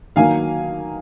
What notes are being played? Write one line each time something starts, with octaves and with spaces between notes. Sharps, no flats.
D#3 F#3 A#3 F5 G#5